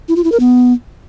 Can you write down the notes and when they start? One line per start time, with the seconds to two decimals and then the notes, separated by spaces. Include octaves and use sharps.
0.09 E4
0.16 F4
0.24 E4
0.32 A#4
0.40 B3